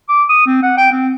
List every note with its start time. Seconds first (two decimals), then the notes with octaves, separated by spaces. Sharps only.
0.08 D6
0.29 D#6
0.46 C4
0.62 F#5
0.77 G5
0.91 C4